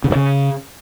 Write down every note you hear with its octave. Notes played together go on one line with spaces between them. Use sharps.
C#3
G2
C#3